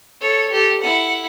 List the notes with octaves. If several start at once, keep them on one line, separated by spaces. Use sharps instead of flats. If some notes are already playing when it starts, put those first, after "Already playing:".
A4 C#5
G4 A4
E4 F#5